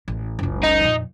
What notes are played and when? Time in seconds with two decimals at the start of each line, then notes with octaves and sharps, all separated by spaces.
0.08 A1
0.39 F#1 C#2
0.63 D#4
0.80 F2 A#2